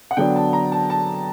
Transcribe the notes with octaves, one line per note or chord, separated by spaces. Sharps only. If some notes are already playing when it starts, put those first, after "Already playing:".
F#5
D3 F#3 B3 D4 G5
A5
A#5
A5
A5